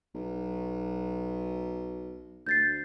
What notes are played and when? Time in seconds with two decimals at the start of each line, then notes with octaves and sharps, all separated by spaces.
0.15 B1
2.46 D2 G6 A6 C7